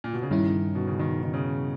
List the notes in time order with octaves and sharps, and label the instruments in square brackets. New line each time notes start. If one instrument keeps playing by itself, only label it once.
[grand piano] A#2
B2
C#3
[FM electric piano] G2 G3 C#4 E4 [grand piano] D#3
[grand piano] B2
C#3
D#3
D#3
C#3